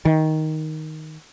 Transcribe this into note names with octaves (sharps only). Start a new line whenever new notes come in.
D#3